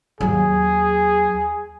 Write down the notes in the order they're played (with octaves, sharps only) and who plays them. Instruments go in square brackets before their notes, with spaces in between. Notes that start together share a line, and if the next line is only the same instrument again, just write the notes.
[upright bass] D#2 F#3 [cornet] G#4